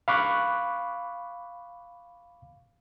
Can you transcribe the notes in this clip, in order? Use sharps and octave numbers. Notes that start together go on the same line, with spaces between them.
F5 B5 C#6 D6 F#6